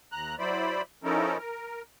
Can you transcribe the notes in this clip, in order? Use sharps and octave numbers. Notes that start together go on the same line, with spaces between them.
D#2 A#5 F#6
F#3 E4 C5 D5 B5
F3 C#4 D#4 E4 A4 A#4
A#4